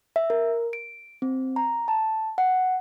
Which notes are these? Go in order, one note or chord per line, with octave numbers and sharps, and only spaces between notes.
E5
A#4
D7
C4
A#5
A5
F#5